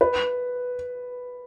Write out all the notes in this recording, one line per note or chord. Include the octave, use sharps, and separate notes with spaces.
B4